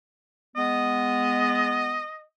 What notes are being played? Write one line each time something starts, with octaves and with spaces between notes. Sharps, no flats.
G#3 B3 D#5